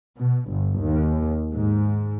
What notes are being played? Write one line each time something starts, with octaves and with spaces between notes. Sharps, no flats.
B2
G1
D#2
G#2